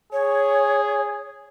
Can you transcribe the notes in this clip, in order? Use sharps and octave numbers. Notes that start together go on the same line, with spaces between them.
G#4 C#5